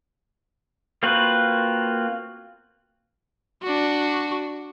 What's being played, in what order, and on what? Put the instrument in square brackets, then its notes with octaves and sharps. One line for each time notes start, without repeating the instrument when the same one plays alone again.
[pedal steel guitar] A#3 C4 F4 F#4 B4
[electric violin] D4 F#4